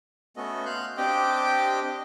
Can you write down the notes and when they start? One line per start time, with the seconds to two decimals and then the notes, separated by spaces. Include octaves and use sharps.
0.37 A3 B3 C#4 F#4 A4 D#5
0.66 F5 C6 F#6 G6
0.97 C4 D4 G4 D#5 G5 D6